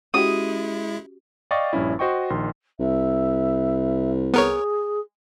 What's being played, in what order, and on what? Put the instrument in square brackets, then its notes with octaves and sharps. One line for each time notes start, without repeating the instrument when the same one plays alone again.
[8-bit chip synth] G#3 E4 [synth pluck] C#4 F#4 G4 [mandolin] D#6
[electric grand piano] D5 D#5 F5 G5 C#6 A6
A#1 G2 C#4 E4
F#4 C5 D#5 G5 C#6
A#1 D#3 C6
[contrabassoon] C2 [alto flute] E5
[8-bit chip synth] B3 A#4 C#5 [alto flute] G#4